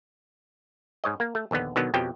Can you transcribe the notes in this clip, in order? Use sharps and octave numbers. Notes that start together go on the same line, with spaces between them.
G#2 C#5 D#5
A#3
A3
A#1 D#2 D3 B3
B2 D3 D#3 F#3 B3
F2 B2 F3 G4 C#5 G5